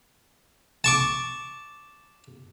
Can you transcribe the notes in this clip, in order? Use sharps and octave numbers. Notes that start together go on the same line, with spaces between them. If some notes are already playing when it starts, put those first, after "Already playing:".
A5 C#6 D6